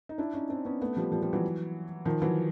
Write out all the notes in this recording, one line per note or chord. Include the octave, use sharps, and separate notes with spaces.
D#4
D4 E4
C#4 D#4
C4 D4
B3 C#4
A3 B3
F3 G3
F3 G3
F3 G3
E3 F#3
D#3 F3
E3 F#3